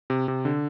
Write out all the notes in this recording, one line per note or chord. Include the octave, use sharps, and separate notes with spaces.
C3
C3
D3